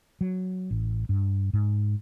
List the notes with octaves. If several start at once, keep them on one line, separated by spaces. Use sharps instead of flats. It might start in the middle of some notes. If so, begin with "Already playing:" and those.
F#3
A1
G2
G#2